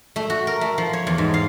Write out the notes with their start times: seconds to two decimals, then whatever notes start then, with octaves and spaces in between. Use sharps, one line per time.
0.16 A3
0.30 F#4
0.47 A#4
0.61 A3
0.78 F3
0.93 C#5
1.07 E2
1.18 G#2
1.34 F5